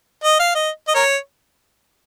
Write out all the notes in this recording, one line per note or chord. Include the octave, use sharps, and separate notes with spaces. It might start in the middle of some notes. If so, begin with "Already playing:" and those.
D#5
F5
D#5
D#5
A#4 C#5